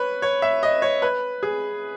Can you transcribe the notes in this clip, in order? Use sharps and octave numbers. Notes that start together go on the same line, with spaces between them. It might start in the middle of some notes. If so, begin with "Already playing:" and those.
Already playing: B4 C#5
C#5
E5
D#5
C#5
B4
G#4